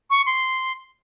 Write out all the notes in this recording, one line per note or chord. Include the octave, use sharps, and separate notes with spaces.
C#6
C6